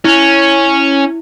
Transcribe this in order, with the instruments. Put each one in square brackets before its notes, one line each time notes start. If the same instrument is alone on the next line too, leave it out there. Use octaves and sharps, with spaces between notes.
[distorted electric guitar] C#4 [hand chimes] E4